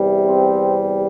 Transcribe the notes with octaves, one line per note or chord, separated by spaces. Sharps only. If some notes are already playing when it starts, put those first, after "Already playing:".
Already playing: E2 C3 G3
C4